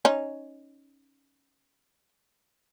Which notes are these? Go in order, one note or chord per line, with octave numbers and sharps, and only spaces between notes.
C#4 D#4